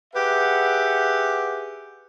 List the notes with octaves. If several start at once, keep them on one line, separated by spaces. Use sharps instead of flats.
G4 G#4 B4 E5 F#5